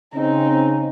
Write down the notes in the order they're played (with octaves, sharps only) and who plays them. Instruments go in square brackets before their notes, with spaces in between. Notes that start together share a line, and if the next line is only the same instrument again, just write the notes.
[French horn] C#3 [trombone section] C4 [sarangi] D#4